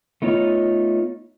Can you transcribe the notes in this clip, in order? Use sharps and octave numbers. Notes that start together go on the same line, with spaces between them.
A3 B3 D#4 F4 C#5